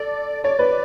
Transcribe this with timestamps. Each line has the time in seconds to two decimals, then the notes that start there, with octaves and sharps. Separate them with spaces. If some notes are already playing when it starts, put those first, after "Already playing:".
Already playing: A4 D5
0.44 C#5 D5
0.59 B4